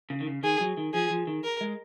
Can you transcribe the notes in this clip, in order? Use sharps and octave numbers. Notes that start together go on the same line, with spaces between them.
C#3
D#3
C#3
D#3 G#4
F#3
D#3
F3 G#4
F3
D#3
A#4
G#3